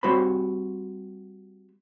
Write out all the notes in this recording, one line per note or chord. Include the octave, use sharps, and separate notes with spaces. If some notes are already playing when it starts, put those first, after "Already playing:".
G3 C4 F#4 C5 C#5 B5